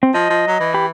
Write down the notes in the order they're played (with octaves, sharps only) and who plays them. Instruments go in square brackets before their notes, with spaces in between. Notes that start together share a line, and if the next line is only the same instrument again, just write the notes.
[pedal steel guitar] C4
[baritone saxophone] F3 [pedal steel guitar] D#5
[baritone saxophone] F3
F#3
E3
[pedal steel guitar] G4 B5